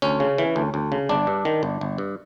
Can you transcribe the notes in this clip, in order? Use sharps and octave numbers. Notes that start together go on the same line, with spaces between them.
D2 C#4
C#3
E3
D2
D2
C#3
G1 D4
G2
D#3
G1
G1
G2